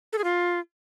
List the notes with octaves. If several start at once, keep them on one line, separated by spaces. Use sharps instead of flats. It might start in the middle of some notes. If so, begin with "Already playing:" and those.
A4
G#4
F4